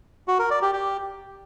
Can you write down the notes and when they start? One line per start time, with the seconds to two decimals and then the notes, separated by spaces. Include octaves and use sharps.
0.28 F#4
0.39 A#4
0.51 D5
0.62 G4
0.73 G4